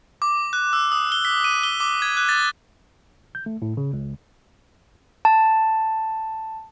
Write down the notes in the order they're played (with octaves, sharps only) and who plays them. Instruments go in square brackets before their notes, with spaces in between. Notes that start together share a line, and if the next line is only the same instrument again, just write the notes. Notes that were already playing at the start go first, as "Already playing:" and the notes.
[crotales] D6
F#6
E6
D#6
G7
B6
D#7
G7
D6
G#6
F#6
A6
[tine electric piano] G6
A3
A2
C#3
C#2
[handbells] A5